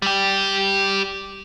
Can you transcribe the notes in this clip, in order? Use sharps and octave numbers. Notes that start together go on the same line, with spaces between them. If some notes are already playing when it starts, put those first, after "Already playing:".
G3 G4